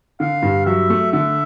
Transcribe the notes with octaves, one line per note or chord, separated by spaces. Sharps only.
D3 F5
G2
F#3 E5
A3
D3 E5